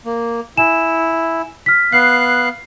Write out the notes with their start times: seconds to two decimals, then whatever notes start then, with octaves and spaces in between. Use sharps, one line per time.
0.05 A#3
0.57 E4 G#5 E7
1.66 F6 B6
1.93 B3 F5 F#6 C7